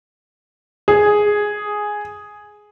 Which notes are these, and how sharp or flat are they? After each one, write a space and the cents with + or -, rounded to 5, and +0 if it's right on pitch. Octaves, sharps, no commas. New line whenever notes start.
G#4 +0